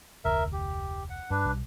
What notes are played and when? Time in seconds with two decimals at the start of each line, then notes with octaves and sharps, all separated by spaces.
0.25 F1 D2 A#4 E5
0.53 G4
1.10 F#5
1.30 G2 D4 B4
1.45 B1 G3